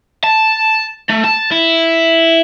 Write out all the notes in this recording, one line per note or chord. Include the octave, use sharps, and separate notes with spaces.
A5
A3
A5
E4